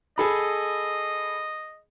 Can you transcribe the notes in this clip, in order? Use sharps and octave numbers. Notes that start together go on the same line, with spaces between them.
G#4 A4 D#5 B5